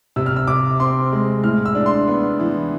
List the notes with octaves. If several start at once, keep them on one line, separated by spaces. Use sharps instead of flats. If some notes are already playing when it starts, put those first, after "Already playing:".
C3 E6
F6
E6
C3 D6
C4 C6
G#3
A2 F6
E6
D4
C6
B3
E3